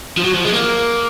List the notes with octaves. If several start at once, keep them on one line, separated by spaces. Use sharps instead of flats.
F3
F#3
F3
G#3
A#3